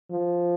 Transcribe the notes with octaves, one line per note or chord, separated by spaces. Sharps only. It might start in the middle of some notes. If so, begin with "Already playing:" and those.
F3